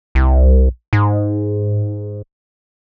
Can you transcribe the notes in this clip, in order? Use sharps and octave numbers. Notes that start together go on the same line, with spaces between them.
C2
G#2